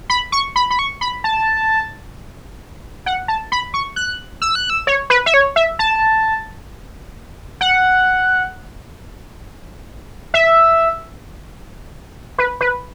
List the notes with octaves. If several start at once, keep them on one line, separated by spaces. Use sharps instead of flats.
B5
C#6
B5
B5
C#6
B5
A5
F#5
A5
B5
C#6
F#6
E6
F#6
E6
C#5
B4
E5
C#5
E5
A5
F#5
E5
B4
B4